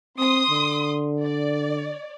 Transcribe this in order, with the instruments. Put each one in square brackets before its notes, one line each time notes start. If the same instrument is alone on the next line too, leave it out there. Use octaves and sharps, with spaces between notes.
[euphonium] C4 [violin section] C6 D#6
[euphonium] D3
[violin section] D5